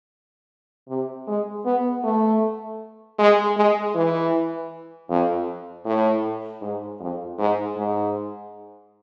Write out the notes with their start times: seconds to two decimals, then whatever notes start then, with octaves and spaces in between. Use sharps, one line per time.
0.88 C3
1.27 G#3
1.65 B3
2.04 A3
3.19 G#3
3.56 G#3
3.94 E3
5.09 F2
5.85 A2
6.61 G#2
7.00 F2
7.38 G#2
7.76 G#2